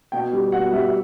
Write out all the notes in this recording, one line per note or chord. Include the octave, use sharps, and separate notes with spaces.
B2 G5
G3
B2 F#5
G3 E5
E5